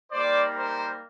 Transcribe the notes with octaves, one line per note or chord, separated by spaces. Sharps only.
G3 A#3 D#4 C5 D5
A#4 C5